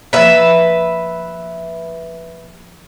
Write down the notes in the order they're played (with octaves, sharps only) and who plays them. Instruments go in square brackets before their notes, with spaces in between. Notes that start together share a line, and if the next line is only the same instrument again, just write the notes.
[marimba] F3 A#3 [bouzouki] B4 E5